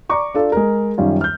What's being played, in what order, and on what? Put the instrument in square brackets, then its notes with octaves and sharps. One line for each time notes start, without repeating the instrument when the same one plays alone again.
[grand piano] D5 A#5 C#6 D6
D4 F4 A4
G#3 A#4
F#2 D#3 G3 C#4 F4
F6 G6